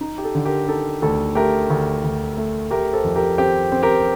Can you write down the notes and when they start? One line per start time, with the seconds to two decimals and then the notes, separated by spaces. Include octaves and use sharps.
0.01 D#4
0.18 G4
0.24 A4
0.35 D3
0.45 G4 A#4
0.68 D#4 A4
1.02 D2 A4
1.35 A3 G4 A#4
1.70 D2
2.04 D2
2.37 A3
2.71 A3 G4 A#4
2.93 A4 C5
3.04 F2
3.16 G4 A#4
3.38 C4 G4
3.72 C4
3.83 G4 A#4